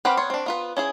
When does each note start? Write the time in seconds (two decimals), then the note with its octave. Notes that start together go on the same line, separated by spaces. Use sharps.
0.05 C4 G4 B4 F#5 B5 F6
0.17 B3 C#5 C6 C#6
0.30 C4 D4
0.46 B3 F4 B4
0.77 C#4 E4 G#4